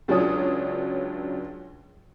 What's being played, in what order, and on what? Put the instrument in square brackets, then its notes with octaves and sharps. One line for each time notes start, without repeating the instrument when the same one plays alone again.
[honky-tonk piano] C#2 F#3 D4 C#5 D#6